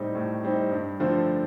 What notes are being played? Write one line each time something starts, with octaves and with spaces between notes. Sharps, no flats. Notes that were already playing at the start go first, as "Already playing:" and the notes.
Already playing: A2 G3 C4 D#4
A2
G3 C4 D#4
G2
D3 F3 A3 C4